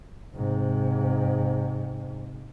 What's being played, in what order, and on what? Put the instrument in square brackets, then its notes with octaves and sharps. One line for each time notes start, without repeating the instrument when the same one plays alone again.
[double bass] G#2 C3